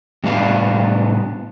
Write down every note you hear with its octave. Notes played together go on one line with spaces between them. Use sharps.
A2 G3 B3 D4 F5